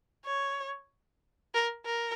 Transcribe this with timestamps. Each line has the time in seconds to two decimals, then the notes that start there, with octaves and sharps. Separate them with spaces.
0.25 C#5
1.54 A#4
1.86 A#4